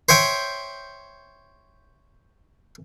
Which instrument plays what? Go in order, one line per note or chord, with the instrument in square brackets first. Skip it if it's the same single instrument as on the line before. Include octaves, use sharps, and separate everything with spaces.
[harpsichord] C5 C#5 E5 G5